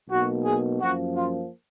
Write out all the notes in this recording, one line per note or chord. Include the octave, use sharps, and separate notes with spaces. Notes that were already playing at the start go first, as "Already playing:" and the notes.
B1 B2 A#3 F#4
G#4
F#2 F3 A#3 F#4
F4